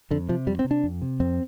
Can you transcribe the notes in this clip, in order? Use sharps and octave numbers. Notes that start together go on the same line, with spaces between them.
F2 D3
C3 F3
F2 G3
C4
C3
D4
F2
C3
F2 C4